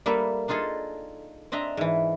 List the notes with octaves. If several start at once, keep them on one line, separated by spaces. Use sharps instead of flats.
G3 A#3 A4 B4 E5
D4 D#4 F4 G#4 A4
C4 D4 D#5 E5 A#5
G#2 E3